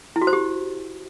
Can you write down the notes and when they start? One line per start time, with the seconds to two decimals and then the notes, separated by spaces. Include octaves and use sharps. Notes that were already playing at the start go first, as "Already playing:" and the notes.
0.16 E4
0.21 F#4
0.27 C5
0.33 G4